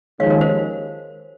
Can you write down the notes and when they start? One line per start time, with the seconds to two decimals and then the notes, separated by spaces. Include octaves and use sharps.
0.20 D#2 C#3 F3 G#3 C#5 F5
0.30 A#4 C#5
0.41 C5